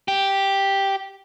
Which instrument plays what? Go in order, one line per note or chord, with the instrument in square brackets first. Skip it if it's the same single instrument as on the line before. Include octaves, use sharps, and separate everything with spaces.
[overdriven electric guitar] G4